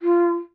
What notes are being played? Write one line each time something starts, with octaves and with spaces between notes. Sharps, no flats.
F4